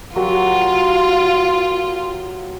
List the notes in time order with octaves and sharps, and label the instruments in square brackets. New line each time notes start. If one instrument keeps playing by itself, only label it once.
[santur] F#3 G4 A#4 [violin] F4